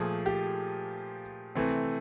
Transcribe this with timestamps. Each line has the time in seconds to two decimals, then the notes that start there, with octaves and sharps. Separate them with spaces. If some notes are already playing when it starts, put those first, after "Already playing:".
Already playing: A#2 F3 A3 G#4
0.26 G4
1.55 C3 E3 A3 C4